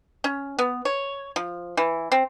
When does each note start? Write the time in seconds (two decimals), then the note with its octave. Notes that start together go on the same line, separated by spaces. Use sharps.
0.24 C#4
0.59 B3
0.85 C#5
1.36 F3
1.77 E3
2.12 C4